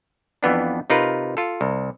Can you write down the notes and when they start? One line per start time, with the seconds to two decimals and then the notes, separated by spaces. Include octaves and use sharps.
0.43 F2 E3 B3 D4
0.90 C3 D#4 F4 A#4 B4
1.37 F4 A4
1.61 C2